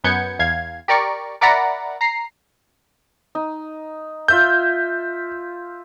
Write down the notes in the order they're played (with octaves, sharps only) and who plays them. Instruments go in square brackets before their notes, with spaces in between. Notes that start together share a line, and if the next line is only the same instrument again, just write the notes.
[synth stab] F#2 B3 G6 G#6 C#7
E2 F5 G#6
G4 A#4 D5 C#6
A#4 D5 E5 F#5 A#5 B5
A#5 C7
[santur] D#4
[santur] F4 E5 E6 [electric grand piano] G6